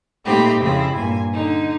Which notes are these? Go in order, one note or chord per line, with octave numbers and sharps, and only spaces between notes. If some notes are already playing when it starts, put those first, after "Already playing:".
A#2 A3 C4 D#4 G4 B5
F2 C#3 C4 E4 B5
G2 A#2 G#5
D3 D#4